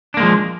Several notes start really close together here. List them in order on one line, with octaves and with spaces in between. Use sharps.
D4 A#3 G#3 F3